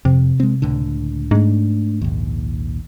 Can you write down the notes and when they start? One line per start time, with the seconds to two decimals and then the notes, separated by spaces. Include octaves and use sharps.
0.05 F2 C3
0.40 G#3 C4
0.62 C#2 A2 D3
1.31 G#2 A3 D4
2.01 A#1 D#2